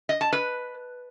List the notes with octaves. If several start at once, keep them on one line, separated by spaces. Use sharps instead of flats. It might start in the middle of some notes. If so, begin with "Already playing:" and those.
D#5
A5
B4